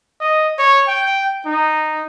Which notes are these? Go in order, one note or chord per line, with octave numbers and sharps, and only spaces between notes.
D#5
C#5
G5
D#4